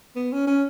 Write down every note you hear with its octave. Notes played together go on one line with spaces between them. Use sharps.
B3
C#4
C#4